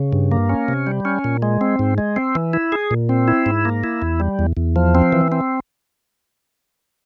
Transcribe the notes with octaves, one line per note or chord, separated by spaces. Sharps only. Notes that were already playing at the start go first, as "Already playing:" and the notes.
Already playing: C#3
G2
A#3
C#4
C3
G3
C#4
A#2
G#3
C4
G#2
G#3
C4
E3
E4
G#4
A#2
C4
E4
G#2
A#3
E4
E2
G3
E2
E2
F3
C4
E3
C4